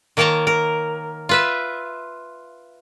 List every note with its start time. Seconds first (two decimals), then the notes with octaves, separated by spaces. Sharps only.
0.17 D#3 A#3 A#4 C#5 A5 A#5
0.47 A#4
1.29 F4 B4 E5